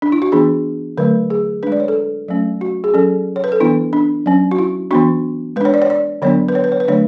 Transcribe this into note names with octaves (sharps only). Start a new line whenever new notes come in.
D4
E4
F#4
E3 B3 D4 G#4
D3 F#3 A3 B4
G#4
G#3 D4 B4
D5
C#5
A4
F#3 A3 C#4
F#4
G#4
F#3 C#4 A4
C#5
B4
A4
E3 B3 D4 E4
D4
F#3 C#4
F#4
E4
E3 B3 D4 F#4
G#3 D4 B4 C#5
D5
C#5
D5
D3 F#3 B3 D4 C#5
B4
C#5
B4
C#5
B4
D3 F#3 A3 D4 C#5